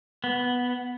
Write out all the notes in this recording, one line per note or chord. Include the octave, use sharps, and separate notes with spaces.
B3